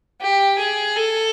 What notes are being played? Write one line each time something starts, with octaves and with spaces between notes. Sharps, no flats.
G4
G#4
A4